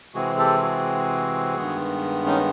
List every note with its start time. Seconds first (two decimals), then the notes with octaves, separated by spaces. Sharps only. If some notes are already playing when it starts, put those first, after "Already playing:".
0.15 C3 E3 G#3 C4 F#4 G#4
0.38 G4 A4
0.62 F#4 G#4
1.56 G2 D#3 G#3 B3
2.26 C#4 D#4